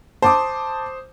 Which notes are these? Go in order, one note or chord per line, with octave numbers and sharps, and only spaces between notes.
C5 A5 D6 D#6